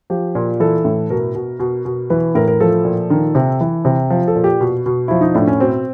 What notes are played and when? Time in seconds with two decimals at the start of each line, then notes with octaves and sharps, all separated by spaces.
0.10 F3 G4
0.35 A#2
0.60 E3 A4
0.85 A2
1.10 B2 A#4
1.35 B2
1.59 B2
1.85 B2
2.10 E3 B4
2.35 A2 A#4
2.48 A#4
2.60 F3 A4
2.85 A#2
3.10 D#3
3.35 C3
3.61 E3
3.85 C3
4.10 F3
4.28 A4
4.35 A#2
4.44 G4
4.61 B2
4.86 B2
5.08 F3 E4
5.21 D#4
5.35 A2 D4
5.47 C#4
5.60 B2 C4